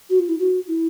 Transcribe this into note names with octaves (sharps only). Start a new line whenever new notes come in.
F#4
F4
E4
F#4
E4